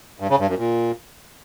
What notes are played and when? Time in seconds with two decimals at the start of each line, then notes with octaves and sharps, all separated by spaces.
0.20 G2
0.30 C#3
0.39 G2
0.49 F#2
0.59 A#2